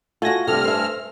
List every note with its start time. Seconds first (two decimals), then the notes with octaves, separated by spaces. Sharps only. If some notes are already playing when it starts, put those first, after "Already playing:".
0.22 A3 F4 F#4 G#5 A#6
0.47 G2 C3 A4 F6
0.64 C5 E5